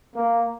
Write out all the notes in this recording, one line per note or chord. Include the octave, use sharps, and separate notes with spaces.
A#3